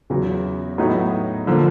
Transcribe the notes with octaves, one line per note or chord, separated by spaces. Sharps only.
E2 C#3 F#3
A2 F#3 B3 D#4
D3 F3 A#3